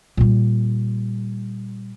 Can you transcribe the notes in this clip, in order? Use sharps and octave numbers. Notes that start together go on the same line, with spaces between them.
A#2 G3